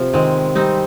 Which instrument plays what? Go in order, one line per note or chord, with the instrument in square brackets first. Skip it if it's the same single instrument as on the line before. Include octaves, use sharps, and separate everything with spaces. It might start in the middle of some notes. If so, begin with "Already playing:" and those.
Already playing: [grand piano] C3 F4 [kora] F3
[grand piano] D#3 [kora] G#3 C4
[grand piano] G3 [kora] C4 D#4